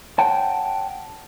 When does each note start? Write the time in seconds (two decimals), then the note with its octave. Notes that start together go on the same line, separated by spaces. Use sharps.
0.19 C#5 F#5 G5 A5